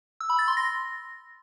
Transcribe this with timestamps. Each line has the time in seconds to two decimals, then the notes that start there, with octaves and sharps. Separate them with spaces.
0.20 E6
0.30 B5
0.39 A6
0.48 C6
0.57 A#6